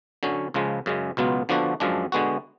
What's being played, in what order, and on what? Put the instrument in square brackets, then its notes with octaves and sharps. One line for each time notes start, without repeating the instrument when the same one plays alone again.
[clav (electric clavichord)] D3 F#3 C#4
C#2 C#3 F3 G#3
F#2 C#3 G#3
C#2 B2 F#3 B3 F4
D3 F3 B3 D4 F#4
F#2 F3 G#3 D4
D3 G#3 B3 F#4